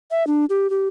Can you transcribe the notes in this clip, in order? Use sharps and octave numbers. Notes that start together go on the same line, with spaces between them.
E5
D4
G4
G4